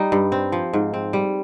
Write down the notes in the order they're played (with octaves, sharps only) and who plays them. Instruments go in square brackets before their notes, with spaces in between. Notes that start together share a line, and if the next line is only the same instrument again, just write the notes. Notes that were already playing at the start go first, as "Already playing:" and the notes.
Already playing: [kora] G3 D#4
G2
C4
F3
G#2
C4
G3